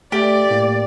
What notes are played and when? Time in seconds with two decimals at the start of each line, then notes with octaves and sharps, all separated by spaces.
0.12 A3 G4 D5
0.51 A2 A#3